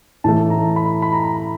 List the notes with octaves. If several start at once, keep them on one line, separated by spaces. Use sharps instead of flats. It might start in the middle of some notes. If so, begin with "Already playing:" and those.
A2 E3 A3 A5
A#5
B5
B5
A#5
B5